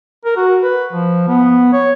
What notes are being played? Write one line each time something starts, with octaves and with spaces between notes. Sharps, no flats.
A#4
F#4
B4
F3
B3
C#5